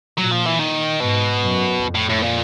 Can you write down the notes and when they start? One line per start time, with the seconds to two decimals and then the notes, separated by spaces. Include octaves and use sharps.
0.18 A#2 F#3
0.32 F3
0.46 E3
0.59 D#3
1.00 G#2 B2
1.41 F#2
1.81 F2
1.95 A2
2.09 A2
2.22 A#2